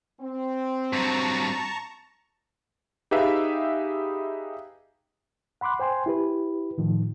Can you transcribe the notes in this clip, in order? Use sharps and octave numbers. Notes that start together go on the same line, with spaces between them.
C4
G2 F#3 A5 A#5 C#6
D#4 G4 G#4 B4 E5 F5
F#5 B5 C6 D6 F#6
C5 G5 G#5 C6
E4 G4 B4
A2 D#3 F3